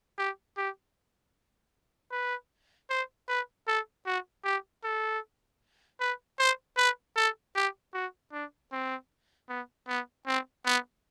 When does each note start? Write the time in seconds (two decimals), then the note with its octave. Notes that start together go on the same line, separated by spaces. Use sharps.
0.18 G4
0.57 G4
2.11 B4
2.90 C5
3.29 B4
3.68 A4
4.06 F#4
4.45 G4
4.84 A4
6.00 B4
6.39 C5
6.77 B4
7.16 A4
7.55 G4
7.94 F#4
8.33 D4
8.72 C4
9.49 B3
9.88 B3
10.27 C4
10.65 B3